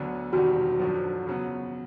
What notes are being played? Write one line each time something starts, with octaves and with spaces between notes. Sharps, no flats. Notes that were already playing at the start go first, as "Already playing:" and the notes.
Already playing: D2 D3 F#3 B3
E1 E2 C3 D#3 G3 F#4
G#1 F#2 D3 F3
C#3 F#3 B3